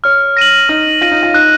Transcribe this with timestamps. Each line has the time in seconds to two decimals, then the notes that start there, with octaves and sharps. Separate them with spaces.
0.04 C#5 F6
0.37 A#6 D#7 F#7
0.69 D#4 F6
1.01 F4 A#6 D#7 F#7
1.11 D#4
1.23 F4
1.34 D#4 F#6